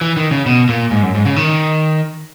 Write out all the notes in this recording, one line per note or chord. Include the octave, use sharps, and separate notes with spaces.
E3
D#3
C#3
B2
A#2
G#2
F#2
G#2
C#3
D#3